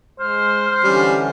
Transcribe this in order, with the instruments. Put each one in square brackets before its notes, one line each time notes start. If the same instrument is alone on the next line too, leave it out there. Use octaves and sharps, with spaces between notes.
[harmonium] G#3 [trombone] C5 [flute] F6
[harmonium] D3 E3 C#4 [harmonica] G3